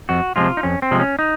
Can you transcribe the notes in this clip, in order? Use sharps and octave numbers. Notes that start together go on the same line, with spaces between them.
F2 F#4
C3 F3 G#3 F4
D#4
F2 C#4
C4
C3 F3 G#3
C#4
D#4